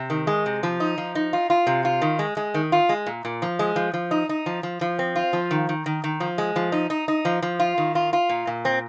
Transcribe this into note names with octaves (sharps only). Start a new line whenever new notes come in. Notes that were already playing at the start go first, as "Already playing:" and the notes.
Already playing: C3
D#3
G#3
C3
F3
D#4
F3
D#4
F4
F4
C3
F4
D#3
G#3
G#3
D#3
F4
G#3
A#2
A#2
F3
G#3
F3
F3
D#4
D#4
F3
F3
F3
C4
F4
F3
D#3
D#3
D#3
D#3
F3
G#3
F3
D#4
D#4
D#4
F3
F3
F4
D#3
F4
F4
A#2
A#2
C4